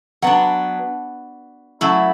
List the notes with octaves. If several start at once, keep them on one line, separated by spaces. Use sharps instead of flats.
F#3 B3 D4 F#5
F#3 A3 C#4 E4